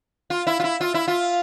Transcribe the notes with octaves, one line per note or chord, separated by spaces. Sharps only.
F4
E4
F4
E4
F4
E4
F4